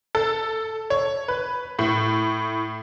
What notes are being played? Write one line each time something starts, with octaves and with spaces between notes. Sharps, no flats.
A4
C#5
B4
A2